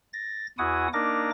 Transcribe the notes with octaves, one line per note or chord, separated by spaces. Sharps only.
A6 A#6
E2 E4 F#4 F#5 G#5 D#6
A#3 D4 D#4 A#4 D6 A#6